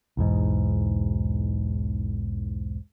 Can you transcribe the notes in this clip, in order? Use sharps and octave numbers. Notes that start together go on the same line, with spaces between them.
B1 E2 G#2